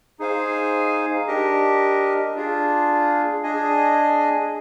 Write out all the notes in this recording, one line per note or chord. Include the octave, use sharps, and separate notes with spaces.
D#4 G#4 C5 F5 G#5
D4 G4 A#4 D#5
D4 F4 G#4
D4 G#4 D#5 G#5